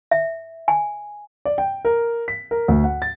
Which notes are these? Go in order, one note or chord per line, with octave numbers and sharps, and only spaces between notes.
E5
G#5
D5
G5
A#4
B6
A#4
D2
F#5
A6